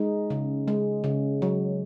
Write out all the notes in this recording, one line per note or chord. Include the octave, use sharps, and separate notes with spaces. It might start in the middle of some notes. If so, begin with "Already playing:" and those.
Already playing: G#3 D#4
C#3
G#3
C#3
F#3